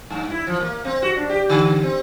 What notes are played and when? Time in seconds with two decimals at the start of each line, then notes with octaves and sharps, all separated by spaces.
0.10 G2
0.30 E4
0.47 F3
0.60 A#3
0.85 C4
1.02 F#4
1.16 D4
1.29 G4
1.50 D3
1.83 C4